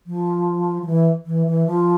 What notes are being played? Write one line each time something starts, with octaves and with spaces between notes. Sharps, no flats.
F3
F3
E3
E3
E3
F3